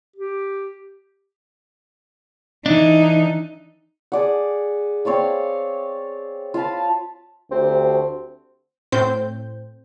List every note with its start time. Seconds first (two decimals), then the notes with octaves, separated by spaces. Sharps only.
0.16 G4
2.66 E3 D4 D#4
4.12 G#4 D5 F#5
5.05 C4 C#5 D5 F5
6.54 F4 F5 A5 B5
7.51 D2 C4 G4
8.92 A2 C4 C5 G6